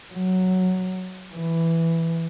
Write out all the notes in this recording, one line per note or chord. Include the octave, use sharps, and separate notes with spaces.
F#3
E3